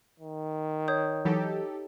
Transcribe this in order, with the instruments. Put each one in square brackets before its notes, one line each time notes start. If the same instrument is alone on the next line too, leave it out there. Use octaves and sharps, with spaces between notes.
[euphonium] D#3
[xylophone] C#5 D#6 G6
[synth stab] E3 F#3 [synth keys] D#4 G4 A4